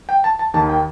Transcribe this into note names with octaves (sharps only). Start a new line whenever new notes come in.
G5
A5
A5
D#2 D#3 A5
G5